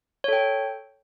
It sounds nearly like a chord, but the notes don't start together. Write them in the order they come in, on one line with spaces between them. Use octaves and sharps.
C#5 A4 G5